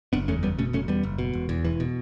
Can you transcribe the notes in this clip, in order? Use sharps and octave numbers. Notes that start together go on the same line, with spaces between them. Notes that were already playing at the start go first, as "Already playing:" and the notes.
F#1 B3 D4
E2 A3 C#4
F#1 G3 B3
B2 A3 C#4
F#1 A3 C#4
E2 G3 B3
F#1
B2
E1
E2
E1 E3
B2